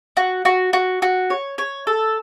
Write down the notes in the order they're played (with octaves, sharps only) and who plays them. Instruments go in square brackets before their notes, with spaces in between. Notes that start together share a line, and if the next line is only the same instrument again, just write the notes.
[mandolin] F#4
F#4
F#4
F#4
C#5
C#5
A4